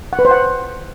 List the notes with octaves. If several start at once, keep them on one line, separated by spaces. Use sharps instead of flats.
F#5
B4
C5
F#5